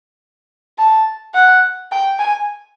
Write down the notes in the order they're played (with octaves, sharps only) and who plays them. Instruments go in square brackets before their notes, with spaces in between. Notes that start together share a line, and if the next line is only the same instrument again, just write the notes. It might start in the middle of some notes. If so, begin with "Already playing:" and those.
[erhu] A5
F#5
G5
G#5